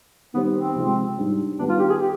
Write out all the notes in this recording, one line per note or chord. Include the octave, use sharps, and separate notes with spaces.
D#3 G3 B3 C4 G4 C5
C4
C3 F3 G#3
G#2 G3 D4
D#3 G3 B3 D4
F4
G4
G#4
G4